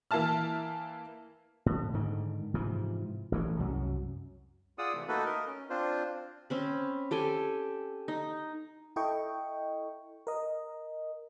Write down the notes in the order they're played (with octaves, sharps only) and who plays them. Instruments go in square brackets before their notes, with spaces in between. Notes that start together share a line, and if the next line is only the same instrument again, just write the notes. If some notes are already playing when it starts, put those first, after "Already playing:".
[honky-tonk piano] E3 A#3 E5 A5 F6
[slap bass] A2
G#2 D3 D#3
G#2 C3 E3 F3
A1 E3 A3
C2 F#2 F#3
[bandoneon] F4 G#4 D5 F#5 D#6 E6
C3 E3 A3
A3 A#3 D#4 F#4 A4 B4
A#4 D#5
C#4
C4 D4 F4 C5
[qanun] C4 C#4 B5
G4 A4 G5 G#5
D#4
[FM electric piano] E4 A4 D#5 G5 C#6
A#4 D#5